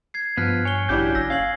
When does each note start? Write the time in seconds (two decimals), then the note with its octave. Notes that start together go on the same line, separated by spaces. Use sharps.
0.14 G#6 C7
0.37 G2 F3 B3 F6 F#6 B6
0.65 C#5 G#5 G7
0.89 A1 F#3 C#4 D4 E4 G4 G6
1.15 F#1 E6 A#6
1.30 C#4 F5 G#6 C7 F#7